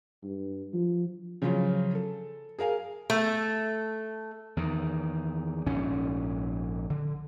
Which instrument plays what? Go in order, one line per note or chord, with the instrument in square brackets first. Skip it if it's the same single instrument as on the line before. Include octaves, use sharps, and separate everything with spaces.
[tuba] G2
F3
[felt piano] C#3 F3 F#3 C#4 F4
A4
G#4 A#4 F5 G#5
[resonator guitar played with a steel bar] A3
[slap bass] E2 D#3
A#1 G#2 C#4
D3